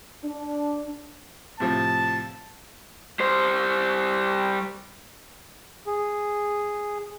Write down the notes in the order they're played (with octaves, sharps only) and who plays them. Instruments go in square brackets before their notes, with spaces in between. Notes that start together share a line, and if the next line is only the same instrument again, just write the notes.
[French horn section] D4
[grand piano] A2 C3 F3 [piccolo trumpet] A5
[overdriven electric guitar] G3 C5
[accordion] G#4